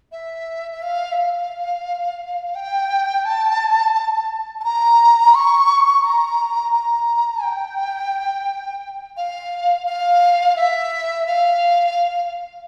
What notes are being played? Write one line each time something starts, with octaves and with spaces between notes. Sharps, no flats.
E5
E5
F5
E5
F5
G5
A5
A5
A#5
C#6
A#5
A#5
G5
F5
F5
E5
F5